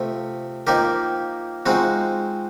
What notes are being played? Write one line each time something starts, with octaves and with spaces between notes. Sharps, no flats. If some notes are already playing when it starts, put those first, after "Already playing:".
Already playing: C3 F3 A3
F3 A#3 D#4 G4 A#4
F3 G#3 C4 D#4 F#4